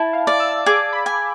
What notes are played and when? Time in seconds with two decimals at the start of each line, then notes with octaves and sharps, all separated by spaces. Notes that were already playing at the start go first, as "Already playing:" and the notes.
Already playing: E4 A5
0.13 F5
0.27 D5
0.40 E6
0.66 G#4 D6
0.93 B5
1.06 G#5